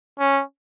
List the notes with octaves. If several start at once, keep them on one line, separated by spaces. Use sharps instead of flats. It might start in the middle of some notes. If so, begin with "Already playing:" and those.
C#4